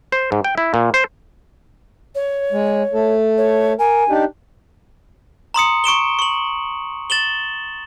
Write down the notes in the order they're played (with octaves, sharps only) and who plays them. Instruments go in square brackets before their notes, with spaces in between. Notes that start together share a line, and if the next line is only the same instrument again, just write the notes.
[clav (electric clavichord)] C5
G#2
G5
E4
A#2
C5
[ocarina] C#5
[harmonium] G#3
A3 A4
[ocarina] C#5
[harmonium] A#4 [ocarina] G#5
[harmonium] D4 D#4 G4
[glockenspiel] A#5 C6 D#6 C#7
C#6 D7 E7 G7
C#6 F#7
A6 E7 F#7 G7